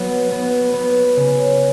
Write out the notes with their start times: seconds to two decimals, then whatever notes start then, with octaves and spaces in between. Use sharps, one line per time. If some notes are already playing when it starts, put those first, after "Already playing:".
Already playing: F#3 B3 F#4
0.31 B3
0.73 B3
1.16 C#3